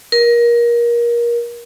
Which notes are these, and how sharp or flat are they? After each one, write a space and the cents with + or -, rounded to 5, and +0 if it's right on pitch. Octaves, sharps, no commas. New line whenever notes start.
A#4 +25